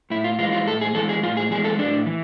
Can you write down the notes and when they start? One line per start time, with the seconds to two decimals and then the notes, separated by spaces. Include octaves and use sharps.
0.10 A2 E4
0.24 F4
0.39 E3 G#3 F4
0.53 F4
0.66 A2 A4
0.81 G#4
0.95 E3 G#3 A4
1.09 G#4
1.23 A2 F4
1.37 G#4
1.51 E3 G#3 G#4
1.64 A4
1.79 A2 D4
2.06 E3